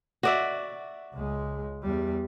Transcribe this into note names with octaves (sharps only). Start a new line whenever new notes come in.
F#4 D5 E5
C#2 G#3
E2 G3